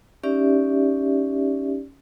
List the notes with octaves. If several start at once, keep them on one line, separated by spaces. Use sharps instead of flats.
C#4 D#4 G4 D5 E5